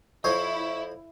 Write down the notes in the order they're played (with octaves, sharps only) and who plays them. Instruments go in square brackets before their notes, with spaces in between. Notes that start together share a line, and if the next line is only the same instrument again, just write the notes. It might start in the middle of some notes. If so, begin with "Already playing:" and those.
[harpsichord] F2 C5 C#5 [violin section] E4 [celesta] C#6